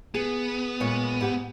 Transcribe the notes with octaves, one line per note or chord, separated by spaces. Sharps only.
B3 G#4
A#2 G#3 C#5
G#2 G4 F#5